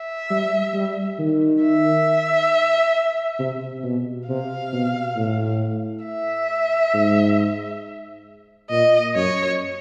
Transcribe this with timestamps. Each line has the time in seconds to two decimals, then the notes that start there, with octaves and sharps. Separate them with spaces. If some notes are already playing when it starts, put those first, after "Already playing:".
Already playing: E5
0.30 G3
0.75 G3
1.19 D#3
1.62 E5
3.39 C3
3.84 B2
4.29 C3 F5
4.73 B2
5.16 A2
6.05 E5
6.94 G#2
8.70 A#2 D#5
9.15 F#2 C#5